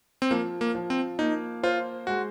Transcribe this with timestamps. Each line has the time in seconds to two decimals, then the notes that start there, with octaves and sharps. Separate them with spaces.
0.22 C4
0.31 F3 A#3
0.61 A#3
0.75 F3
0.90 C4
1.19 A#3 D#4
1.63 F4 C5
2.07 G#3 F#4